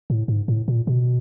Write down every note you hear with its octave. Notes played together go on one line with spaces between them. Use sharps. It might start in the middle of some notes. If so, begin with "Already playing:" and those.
A2
G#2
A2
A#2
B2